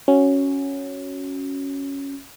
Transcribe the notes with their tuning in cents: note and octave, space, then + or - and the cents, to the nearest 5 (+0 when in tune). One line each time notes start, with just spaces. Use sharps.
C#4 +0 F#4 +0